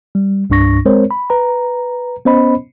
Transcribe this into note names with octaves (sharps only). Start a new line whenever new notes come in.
G3
C2 G2 D4 C#6 A#6
G#3 C4 A#4 C5 C#5
B5
B4 A#5
B3 C#4 C5 D#5 B5